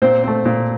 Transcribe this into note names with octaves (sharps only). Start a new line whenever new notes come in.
A#2 C4 C5
A3 C4
A#2